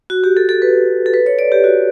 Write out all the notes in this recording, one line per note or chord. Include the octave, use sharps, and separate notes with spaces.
F#4
G4
A4
A4
B4
A4
B4
C#5
D5
G4
F#4